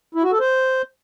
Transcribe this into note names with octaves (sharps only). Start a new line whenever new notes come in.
E4
F#4
A4
C5